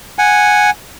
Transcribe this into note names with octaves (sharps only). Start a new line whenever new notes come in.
F#5 G#5